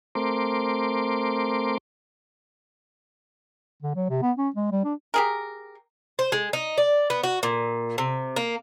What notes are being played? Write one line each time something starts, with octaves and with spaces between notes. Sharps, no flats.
A3 C4 A#4 C6 D6
D3
F#3
C3
B3
C#4
G#3
G3
D4
G4 G#4 A#4
C5
G#3
D#4
D5
B3
F#4
A#2
C3
A#3